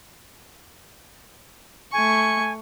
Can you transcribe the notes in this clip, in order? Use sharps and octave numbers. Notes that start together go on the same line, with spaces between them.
A3 G#5 C#6